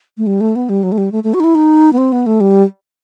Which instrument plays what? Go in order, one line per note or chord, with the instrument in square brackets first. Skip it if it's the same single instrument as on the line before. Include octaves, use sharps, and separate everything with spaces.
[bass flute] A3
G3
A3
B3
G3
F#3
A3
G3
A3
A3
F#4
D#4
E4
D#4
B3
C4
B3
A3
G3